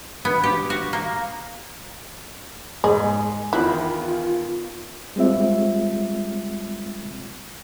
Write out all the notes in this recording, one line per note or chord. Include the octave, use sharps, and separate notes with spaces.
B3
G4
F#4
A#3
G#2 G#4 D#5
E2 D#3 E4 F4 F#6
G3 G#3 C4 F4 E5